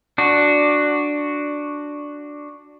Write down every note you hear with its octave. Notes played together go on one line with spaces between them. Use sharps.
D4 F#4